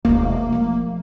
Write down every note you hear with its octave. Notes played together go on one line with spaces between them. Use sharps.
E1 D2 A#3
F3 A3